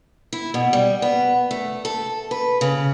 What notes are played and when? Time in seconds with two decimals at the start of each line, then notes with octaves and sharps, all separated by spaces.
0.33 E4
0.54 B2
0.73 G3
1.02 B3
1.51 A3
1.85 A4
2.31 B4
2.61 C#3